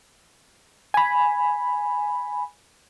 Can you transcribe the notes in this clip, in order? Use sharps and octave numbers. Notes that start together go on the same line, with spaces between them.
G#5 B5